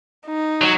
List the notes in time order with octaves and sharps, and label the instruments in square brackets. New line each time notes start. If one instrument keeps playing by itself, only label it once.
[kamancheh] D#4
[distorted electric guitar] F#3